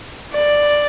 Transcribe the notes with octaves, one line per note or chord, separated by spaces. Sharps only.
D5